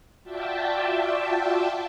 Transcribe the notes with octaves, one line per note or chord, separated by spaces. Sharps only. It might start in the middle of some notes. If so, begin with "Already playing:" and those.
F4 F#4 D5 E5 G5 A5